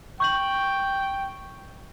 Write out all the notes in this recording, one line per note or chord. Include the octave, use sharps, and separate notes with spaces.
G5 C#6 G6 F#7